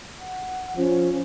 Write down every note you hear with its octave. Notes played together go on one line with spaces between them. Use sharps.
F#5
F3 C#4